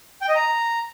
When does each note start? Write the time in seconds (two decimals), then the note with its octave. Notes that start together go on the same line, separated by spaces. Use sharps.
0.22 G5
0.29 D#5
0.35 A#5